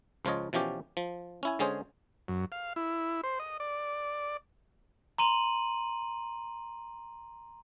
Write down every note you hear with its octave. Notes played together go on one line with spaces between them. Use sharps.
C#2 F3 F4 C#5 D#5
B2 E3 F3 C#4 G4
F3
C#4 E4 G#5
D3 G#3 C#4 G#4 C5 C#5
F#2
F5
E4
C5
D#5
D5
A#5 C6 D#7 F#7